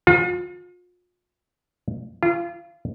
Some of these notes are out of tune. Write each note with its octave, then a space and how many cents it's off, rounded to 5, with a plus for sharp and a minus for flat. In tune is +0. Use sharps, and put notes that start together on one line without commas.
F4 +40
F4 -25